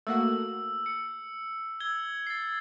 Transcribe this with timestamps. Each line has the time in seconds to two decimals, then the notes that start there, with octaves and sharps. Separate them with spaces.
0.07 A3 A#3 F#4 E6
0.86 C#7
1.80 E6 G#6 G7
2.27 A6 C7